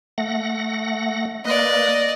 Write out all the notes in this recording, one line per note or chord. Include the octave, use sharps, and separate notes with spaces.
A3 F#5 A#6
A#3 B4 D5 D#5